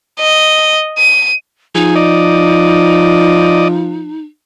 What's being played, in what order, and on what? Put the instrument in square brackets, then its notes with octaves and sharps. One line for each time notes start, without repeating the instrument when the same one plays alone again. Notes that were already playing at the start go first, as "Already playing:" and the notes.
[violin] D#5
D#7
[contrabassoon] F3 [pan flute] D#4 [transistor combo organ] G#4
[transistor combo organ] D5 D#5